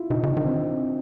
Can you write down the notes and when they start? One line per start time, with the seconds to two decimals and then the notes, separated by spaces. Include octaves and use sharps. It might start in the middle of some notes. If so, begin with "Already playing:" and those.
Already playing: E4 F4
0.10 C3 D#4
0.23 C#3
0.27 D4
0.37 D#3
0.45 C4